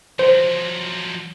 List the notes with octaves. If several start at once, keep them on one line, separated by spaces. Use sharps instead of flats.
F3 F#3 C5